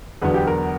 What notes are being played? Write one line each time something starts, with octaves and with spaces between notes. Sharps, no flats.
E2 D3 F#3 B3 B4
G4
A#4